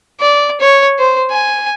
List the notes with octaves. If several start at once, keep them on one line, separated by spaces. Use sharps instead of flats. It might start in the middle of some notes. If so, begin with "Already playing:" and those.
D5
C#5
C5
G#5